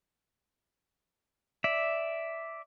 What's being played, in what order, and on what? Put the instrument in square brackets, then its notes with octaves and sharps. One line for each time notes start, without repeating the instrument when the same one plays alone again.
[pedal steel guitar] D5 E5